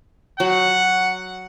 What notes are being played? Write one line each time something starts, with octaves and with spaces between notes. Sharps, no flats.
F#3 F#5